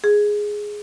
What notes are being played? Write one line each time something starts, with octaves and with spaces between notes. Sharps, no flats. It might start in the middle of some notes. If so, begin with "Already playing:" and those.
G#4